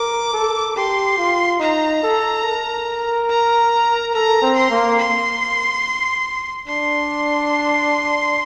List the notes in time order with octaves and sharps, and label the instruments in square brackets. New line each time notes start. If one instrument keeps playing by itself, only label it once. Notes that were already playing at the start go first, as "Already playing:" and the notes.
Already playing: [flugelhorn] A#4 [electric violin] D6
[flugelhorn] A4
[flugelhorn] G4 [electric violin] C6
[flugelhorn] F4
[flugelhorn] D#4 [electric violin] A#5
[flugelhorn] A4
A#4
[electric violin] A#5
[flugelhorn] A4 [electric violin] A#5
[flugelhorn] C4
[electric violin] C6
[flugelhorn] A#3
[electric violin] C6
[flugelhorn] D4 [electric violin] C6